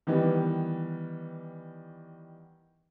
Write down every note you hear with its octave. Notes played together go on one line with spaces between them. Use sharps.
D#3 E3 G3 B3